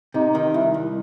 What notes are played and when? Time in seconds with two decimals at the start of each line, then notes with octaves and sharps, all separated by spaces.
0.14 C3 D#4
0.35 D#3
0.54 C2 E4
0.74 C2